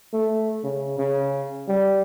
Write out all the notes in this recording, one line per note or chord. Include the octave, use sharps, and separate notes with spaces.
A3
C#3
C#3
G3